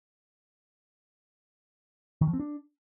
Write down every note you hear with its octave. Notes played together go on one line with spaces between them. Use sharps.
D#3
F3
C4
D4